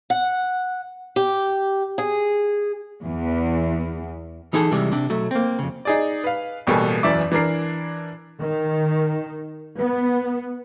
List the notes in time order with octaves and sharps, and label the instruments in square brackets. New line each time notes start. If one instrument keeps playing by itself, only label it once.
[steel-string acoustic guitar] F#5
G4
G#4
[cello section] E2
[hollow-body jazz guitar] E3 D#4 G#4 A4
C3 E3 G3 G#3
C3 D4
B1 F#3 A3
A#3 C4
F2 C#3
[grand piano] D#4 G#4 D5
B4 F5
A1 B2 G3 A#3 A4 G#5
E1 F#2 E3 D5 E5 D6
E3 D4 A#4 C7
[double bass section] D#3
B3